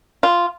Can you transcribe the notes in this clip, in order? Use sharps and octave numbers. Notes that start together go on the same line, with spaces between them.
F4